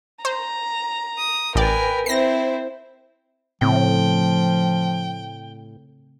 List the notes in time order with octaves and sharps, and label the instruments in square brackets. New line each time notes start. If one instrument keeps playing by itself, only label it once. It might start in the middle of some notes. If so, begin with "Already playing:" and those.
[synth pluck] C5 [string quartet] A#5
[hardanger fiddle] D#6
[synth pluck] A1 D5 [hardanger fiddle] A#4 G#5 [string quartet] B4 G5
[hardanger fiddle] C4 E4 [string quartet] C5 [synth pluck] A#6 C7
[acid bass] A2 [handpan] C#3 A3 C4 [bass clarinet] F3 [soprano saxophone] G5